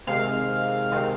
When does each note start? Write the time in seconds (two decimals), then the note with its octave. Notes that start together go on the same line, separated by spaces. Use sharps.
0.07 C3 D#3 G#3 C4 F5
0.91 C3 D#3 G#3 C4